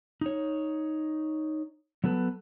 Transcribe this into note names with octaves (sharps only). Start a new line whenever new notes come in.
D#4 C#5
F#3 B3 A4 B4